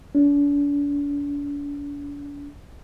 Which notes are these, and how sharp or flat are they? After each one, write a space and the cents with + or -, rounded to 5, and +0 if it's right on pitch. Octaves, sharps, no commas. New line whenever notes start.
D4 -40